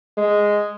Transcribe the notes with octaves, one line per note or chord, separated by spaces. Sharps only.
G#3